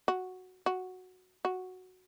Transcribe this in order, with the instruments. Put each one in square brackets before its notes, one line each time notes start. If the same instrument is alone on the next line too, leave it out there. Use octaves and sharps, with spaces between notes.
[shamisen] F#4
F#4
F#4